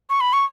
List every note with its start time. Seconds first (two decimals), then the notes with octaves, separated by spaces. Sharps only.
0.10 C#6
0.21 B5
0.33 C#6